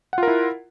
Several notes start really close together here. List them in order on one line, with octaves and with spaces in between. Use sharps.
F#5 F4 A#4 E4